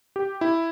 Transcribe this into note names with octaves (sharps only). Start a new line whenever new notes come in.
G4
E4